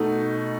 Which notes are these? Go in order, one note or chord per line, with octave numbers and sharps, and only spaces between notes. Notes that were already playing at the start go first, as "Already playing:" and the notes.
Already playing: B2 A3 D#4